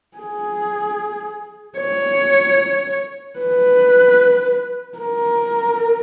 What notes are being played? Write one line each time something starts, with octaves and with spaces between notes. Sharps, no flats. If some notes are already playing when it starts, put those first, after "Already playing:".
G#4
C#5
B4
A#4